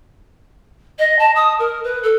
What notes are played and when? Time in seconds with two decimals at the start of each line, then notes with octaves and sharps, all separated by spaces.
0.99 D#5
1.19 A5
1.35 D#6
1.59 A#4
1.84 B4
2.03 A4